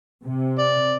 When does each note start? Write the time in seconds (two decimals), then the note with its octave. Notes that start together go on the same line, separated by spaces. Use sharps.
0.25 C3
0.59 D5